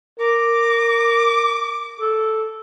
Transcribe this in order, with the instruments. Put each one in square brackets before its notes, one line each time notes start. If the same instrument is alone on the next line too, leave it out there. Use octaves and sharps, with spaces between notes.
[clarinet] A#4 [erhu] D6
[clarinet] A4